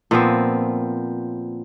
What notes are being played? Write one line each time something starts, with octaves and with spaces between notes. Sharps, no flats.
A#2 F3 B3 C4